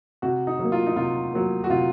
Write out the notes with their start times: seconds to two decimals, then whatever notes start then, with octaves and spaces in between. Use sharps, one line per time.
0.22 C3 F#4
0.47 D#4
0.59 F#3 A#3
0.72 F4
0.87 D#4
0.96 C3 F4
1.33 F#3 A#3
1.64 F#4
1.70 C3 F4